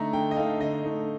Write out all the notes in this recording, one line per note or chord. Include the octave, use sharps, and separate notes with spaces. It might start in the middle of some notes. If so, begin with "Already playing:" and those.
Already playing: D3 A3 D#4 A#5
D3 G5
D#5
A3 D#4 F5
D3 D#5
A3 D#4